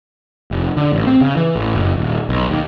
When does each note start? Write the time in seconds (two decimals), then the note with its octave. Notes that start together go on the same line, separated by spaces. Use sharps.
0.51 F1
0.77 D3
0.93 A1
1.07 C4
1.21 C#3
1.36 E3
1.56 A1
1.75 F#1
1.95 D#1
2.29 B1
2.49 D#2